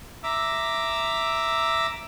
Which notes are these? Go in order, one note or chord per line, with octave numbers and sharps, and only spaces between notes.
E5 A#5 D6 E6